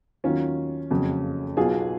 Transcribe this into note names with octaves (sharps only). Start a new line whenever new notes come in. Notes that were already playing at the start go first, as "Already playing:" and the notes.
D#2 D#3 F#3 C#4 F4
F#1 F2 C#3 F#3
B1 B2 F#3 F4 G#4